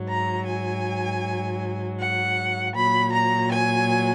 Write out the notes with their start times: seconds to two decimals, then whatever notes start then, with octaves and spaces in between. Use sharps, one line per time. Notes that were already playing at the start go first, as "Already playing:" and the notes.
Already playing: G#2 F#3
0.10 A#5
0.48 G#5
2.00 F#5
2.76 A#2 F#3 B5
3.14 A#5
3.53 G#5